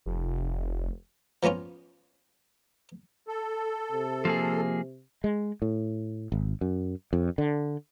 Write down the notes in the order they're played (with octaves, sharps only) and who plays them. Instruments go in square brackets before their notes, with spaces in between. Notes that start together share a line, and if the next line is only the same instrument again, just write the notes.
[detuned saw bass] F1
[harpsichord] F3 A#3 B3 C#4 F4
[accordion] A4
[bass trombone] C3
[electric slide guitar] F3 A#3 G#4
[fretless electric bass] G#3
A2
G#1
F#2
F2
D3